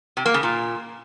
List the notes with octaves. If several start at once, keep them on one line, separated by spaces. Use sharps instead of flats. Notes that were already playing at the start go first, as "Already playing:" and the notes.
C3
A#3
C#3
A#2